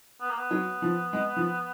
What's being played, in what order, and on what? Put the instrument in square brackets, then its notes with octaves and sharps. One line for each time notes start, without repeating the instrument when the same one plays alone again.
[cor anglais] B3
A#3
B3
[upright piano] F#3
F3
G#3
F3